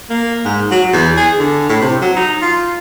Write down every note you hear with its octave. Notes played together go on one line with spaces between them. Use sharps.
A#3
G#2
F#3
E2
G#4
D3
A2
C3
F#3
D#4
F4